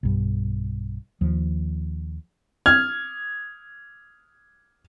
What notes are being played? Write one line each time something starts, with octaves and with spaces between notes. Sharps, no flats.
B1 G2
D#2 F3
F6 G#6